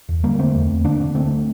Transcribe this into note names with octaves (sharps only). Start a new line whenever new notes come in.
E2
D3 G3 A#3
D3 A3 C4
E2
E2
D3 A#3 D4
D3
D2 A3 C4